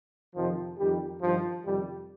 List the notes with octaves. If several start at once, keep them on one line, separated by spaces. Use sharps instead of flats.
F2 C3 D#3 F3
F2 D#3 G3
G2 D#3 F3
F2 C3 D#3 G3